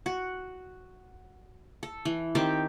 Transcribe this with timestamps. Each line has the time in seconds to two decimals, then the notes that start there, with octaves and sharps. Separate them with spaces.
0.06 F#4
1.83 A4
2.05 E3
2.35 D#3 C4 G4 A5